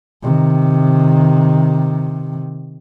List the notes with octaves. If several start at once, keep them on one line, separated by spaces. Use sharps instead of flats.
C3 D#3